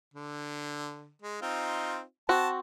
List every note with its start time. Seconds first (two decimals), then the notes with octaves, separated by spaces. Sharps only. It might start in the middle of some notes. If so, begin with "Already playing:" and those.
0.14 D3
1.22 G#3
1.42 C4 D#4 F4
2.29 C4 F#4 A5